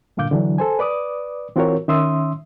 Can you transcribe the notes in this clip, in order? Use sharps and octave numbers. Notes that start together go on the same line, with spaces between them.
G2 A#2 D3 F5 D6 G6
D3 E3 F#3 D4
A4 C5 G#5
B4 D5 D6 D#6
E3 C4 F4 F#4 A#4 C#5
D#3 C#4 E5 C6 D#6 E6